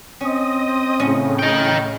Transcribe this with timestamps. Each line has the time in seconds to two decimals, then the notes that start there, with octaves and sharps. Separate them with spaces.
0.21 C4 C#4 D#5 D#6
1.00 A2 C#3 C#4
1.39 D#5 G5